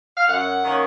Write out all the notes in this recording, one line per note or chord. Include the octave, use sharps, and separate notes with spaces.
F5
F#2 F#5
D#3 A#3 C#4